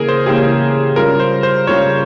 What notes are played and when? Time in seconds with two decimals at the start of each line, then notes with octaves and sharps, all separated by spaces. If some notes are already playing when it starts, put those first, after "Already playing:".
Already playing: C#3 E3 A#3 G#4 A#4
0.09 C5
0.26 C#3 E3 A#3 C#4 G4 G#4
0.96 C#3 G3 C#4 F4 A#4
1.20 C5
1.43 C5
1.67 C#3 G3 C#4 F4 C#5